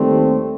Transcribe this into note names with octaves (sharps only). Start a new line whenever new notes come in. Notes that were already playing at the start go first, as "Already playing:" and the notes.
Already playing: D#2 D#3 G3 A3 C4